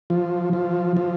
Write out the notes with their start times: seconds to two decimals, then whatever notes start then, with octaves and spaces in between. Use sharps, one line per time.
0.10 F3
0.53 F3
0.97 F3